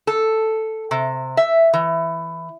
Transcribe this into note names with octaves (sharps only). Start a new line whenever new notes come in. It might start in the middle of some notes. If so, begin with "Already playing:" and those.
A4
C3
E5
E3